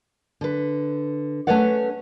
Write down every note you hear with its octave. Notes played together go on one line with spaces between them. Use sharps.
D3 B4
A3 C#4 B4 C#5 D5 F#5